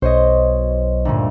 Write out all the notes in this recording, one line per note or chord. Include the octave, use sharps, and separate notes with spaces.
B1 C5 C#5 D#5
D2 G2 A#2